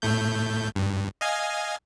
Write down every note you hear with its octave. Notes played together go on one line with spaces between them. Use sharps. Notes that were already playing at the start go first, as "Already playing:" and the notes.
A2 A3 G6
G2
D#5 F5 G#5